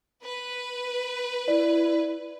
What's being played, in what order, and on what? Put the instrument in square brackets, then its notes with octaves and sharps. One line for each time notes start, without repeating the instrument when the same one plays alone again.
[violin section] B4
[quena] E4 [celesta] D5